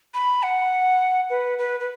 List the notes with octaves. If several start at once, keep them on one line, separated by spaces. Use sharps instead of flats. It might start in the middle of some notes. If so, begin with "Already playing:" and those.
B5
F#5
B4
B4
B4